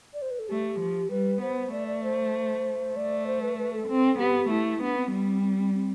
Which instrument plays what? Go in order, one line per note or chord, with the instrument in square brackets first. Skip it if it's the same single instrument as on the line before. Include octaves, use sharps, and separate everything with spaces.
[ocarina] D5
C5
B4
A4
[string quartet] A3 [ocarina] G4
[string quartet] F3
[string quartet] G3 [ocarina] B4
[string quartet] B3 [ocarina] C5
[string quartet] A3 [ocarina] D5
[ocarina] D5
C5
[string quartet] A3 [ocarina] D5
[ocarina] C5
B4
B4
A4
[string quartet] C4
[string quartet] B3 [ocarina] G4
[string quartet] A3 [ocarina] E4
[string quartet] B3 [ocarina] D4
[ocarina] C4
[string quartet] G3 [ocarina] B3
[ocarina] C4
C4
C4
C4